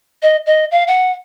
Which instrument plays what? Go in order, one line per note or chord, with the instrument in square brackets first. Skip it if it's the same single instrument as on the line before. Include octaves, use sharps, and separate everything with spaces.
[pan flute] D#5
D#5
F5
F#5